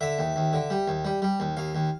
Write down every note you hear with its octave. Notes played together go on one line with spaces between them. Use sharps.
D3 E5
D#2
D#2
D3
G3
D#2
G3
G3
D#2
D#2 F5
D#2